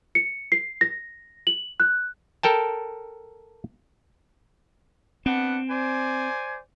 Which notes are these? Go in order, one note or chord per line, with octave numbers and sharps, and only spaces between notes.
C#7
C7
A#6
F#7
F#6
A4 A#4 G5 A5
B3 C4 D4 F#5
C5 D5 G#5